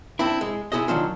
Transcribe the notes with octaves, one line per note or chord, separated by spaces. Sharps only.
C4 D4 E4
G#3
B3 E4 G#4 C5 D#5
D#3 F#3 D4 F4